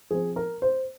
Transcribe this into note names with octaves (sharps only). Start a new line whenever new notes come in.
F3 C4 G#4
A#4
C5